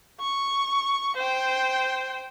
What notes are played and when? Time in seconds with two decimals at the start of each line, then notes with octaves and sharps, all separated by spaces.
0.21 C#6
1.17 C5 G5